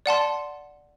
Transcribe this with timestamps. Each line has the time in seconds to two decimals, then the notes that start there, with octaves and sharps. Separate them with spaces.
0.06 D5 F#5 A5 C6